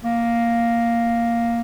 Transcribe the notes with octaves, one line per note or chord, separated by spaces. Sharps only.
A#3